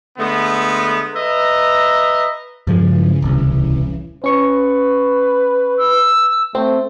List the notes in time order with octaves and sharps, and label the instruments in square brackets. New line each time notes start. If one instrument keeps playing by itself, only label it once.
[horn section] D3 G#3 A3 B3
B4 D#5 E5 A#5
[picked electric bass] G2 F3 G#3 [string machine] C#3 E3
[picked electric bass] D1 C2
[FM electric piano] C#4 C#6 [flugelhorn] B4
[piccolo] E6
[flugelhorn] A3 [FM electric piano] C4